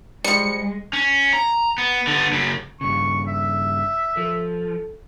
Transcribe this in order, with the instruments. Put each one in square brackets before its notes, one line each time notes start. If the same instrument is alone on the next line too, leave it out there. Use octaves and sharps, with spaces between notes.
[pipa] F3 G3 [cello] G#3 [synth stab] C#7
[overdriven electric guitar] C#4
A#5
B3
D3 B3
F#2 C#3
[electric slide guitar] G2 C#3 [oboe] C#6
[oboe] E5
[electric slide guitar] F3 [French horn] A4